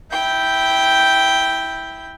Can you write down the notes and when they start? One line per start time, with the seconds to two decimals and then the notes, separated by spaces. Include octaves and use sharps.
0.11 E4 G5 G6